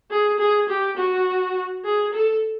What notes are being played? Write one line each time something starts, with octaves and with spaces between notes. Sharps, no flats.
G#4
G#4
G4
F#4
G#4
A4